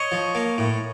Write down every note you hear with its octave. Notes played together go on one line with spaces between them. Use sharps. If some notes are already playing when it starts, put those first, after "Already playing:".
Already playing: C#5 D#5
F3
A#3
A2